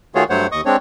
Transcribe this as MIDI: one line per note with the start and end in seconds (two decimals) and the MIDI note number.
0.15 0.24 51
0.15 0.24 57
0.15 0.24 65
0.15 0.24 66
0.15 0.24 68
0.15 0.24 73
0.30 0.47 43
0.30 0.47 54
0.30 0.47 57
0.30 0.47 72
0.30 0.47 73
0.30 0.47 78
0.52 0.61 39
0.52 0.61 75
0.52 0.61 85
0.52 0.61 87
0.65 0.76 56
0.65 0.76 60
0.65 0.76 62
0.65 0.76 73